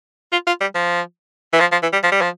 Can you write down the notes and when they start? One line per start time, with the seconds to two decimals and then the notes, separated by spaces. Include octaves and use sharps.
0.32 F4
0.47 F4
0.61 G3
0.75 F3
1.53 E3
1.60 F3
1.72 F3
1.83 E3
1.93 G3
2.04 F3
2.12 G3
2.21 F3